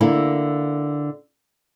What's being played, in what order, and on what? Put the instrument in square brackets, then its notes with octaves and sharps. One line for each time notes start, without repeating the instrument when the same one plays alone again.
[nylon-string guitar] D3 A#3 E4